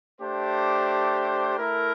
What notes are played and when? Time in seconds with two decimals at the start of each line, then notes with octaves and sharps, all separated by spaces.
0.21 A3 D4 G4 C5
1.58 A3 E4 A#4